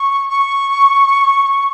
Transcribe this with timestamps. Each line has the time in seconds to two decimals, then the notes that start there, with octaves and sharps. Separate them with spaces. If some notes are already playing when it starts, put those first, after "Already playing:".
Already playing: C#6
0.29 C#6